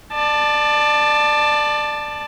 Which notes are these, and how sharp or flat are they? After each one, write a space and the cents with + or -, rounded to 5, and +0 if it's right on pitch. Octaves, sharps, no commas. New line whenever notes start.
D5 +20 A5 +0